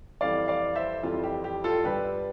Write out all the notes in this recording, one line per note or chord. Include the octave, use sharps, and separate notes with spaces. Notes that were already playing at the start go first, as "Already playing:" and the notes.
F2 E3 G3 D5 F5
D5 F5
C5 E5
F2 E3 G3 F4
G4
G4
F4 A4
G2 D3 G3 G4 B4